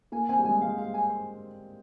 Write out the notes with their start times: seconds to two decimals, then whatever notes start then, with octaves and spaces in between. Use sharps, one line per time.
0.12 A#3 G#5
0.29 C4 G#5
0.39 G3
0.45 G#3 G#5
0.61 G#3 F5
0.77 G3 F5
0.94 G#5
1.10 C5